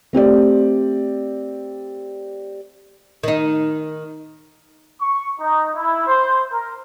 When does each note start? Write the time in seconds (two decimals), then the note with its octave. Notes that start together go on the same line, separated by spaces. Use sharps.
0.13 A3 C4 G4 D5
3.23 D#3 D#4
5.01 C#6
5.40 D#4
5.75 E4
6.06 C5
6.52 A#4